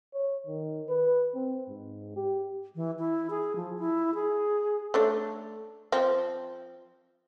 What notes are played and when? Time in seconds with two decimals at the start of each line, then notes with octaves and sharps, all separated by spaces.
0.14 C#5
0.46 D#3
0.89 B4
1.35 C4
1.68 G#2
2.16 G4
2.76 E3
2.99 E4
3.30 G#4
3.56 F3
3.79 E4
4.15 G#4
4.94 A3 D4 C#5
5.92 F3 C4